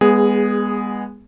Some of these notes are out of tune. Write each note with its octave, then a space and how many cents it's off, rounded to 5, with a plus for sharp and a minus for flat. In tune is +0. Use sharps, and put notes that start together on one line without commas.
G#3 -25 B3 -10 G#4 +0